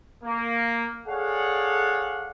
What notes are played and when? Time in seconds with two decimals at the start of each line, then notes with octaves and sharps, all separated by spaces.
0.24 A#3
1.07 G#4 A4 C#5 D5 F5 F#5